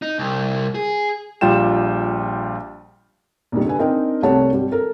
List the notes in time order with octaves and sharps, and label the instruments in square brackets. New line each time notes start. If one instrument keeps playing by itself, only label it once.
[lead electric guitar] D#4
C2
G#4
[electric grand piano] A#1 G3 F4 G5 E7
[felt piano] A#1 F2 C3 D#3 G3
D3 B4 G#5
C4 D4 D#4 A#4 D#5 G5
C2 G3 A3 C#5 F#5 A5
G#1 G3
A4 A#4